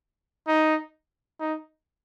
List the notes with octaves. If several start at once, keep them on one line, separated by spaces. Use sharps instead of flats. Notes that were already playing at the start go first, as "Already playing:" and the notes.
D#4
D#4